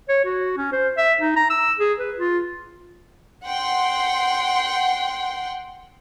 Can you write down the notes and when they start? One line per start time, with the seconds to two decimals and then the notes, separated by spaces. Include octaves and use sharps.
0.09 C#5
0.25 F#4
0.57 C#4
0.73 C5
0.97 E5
1.20 D#4
1.36 A#5
1.50 E6
1.79 G#4
1.99 B4
2.17 F4
3.45 F#5 G5 C6